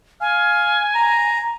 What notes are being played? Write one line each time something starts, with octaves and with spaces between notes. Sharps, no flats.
F5 G#5
A#5